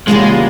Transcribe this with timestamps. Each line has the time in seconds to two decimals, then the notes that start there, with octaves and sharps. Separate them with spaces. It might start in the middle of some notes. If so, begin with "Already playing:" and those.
0.08 E2 C#3 G3 G#3 A#3 F4